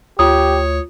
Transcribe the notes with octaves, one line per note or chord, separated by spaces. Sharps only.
D2 F4 G4 C#5 D#6